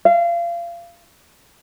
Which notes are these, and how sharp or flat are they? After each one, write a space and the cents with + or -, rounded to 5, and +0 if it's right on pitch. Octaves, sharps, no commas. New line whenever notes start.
F5 -30